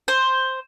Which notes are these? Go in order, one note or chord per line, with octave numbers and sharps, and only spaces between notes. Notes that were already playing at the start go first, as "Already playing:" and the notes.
C5